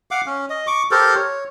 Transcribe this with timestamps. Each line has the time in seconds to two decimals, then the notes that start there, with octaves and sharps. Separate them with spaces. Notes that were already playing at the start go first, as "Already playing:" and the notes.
0.11 F5 F#5 D6
0.26 C#4
0.50 D#5
0.67 C#6 D6
0.91 G4 A4 A#4 C5
1.15 C#5